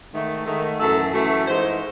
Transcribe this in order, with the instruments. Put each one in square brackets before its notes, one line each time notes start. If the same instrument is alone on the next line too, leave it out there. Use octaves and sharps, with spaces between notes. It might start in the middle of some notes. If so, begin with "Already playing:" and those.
[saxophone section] G#2 D#3 A3
G#2 D#3 A3
F#2 E3 A3 A4
F#2 E3 A3
G#2 E3 G#3 C5